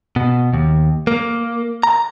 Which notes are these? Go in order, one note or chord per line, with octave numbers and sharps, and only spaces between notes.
B2
D#2
A#3
A#5